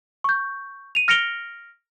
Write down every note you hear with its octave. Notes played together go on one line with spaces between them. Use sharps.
C#6 G6
D#7 F7
F6 A#6 C#7 D7 F7 G7